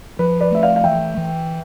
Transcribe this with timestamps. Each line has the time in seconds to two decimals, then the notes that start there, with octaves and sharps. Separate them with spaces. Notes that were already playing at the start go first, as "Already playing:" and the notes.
0.19 F3 B4
0.40 B4 D5
0.51 A3 E5
0.63 D5 F5
0.76 F5
0.84 E3 E5 G5
1.17 E3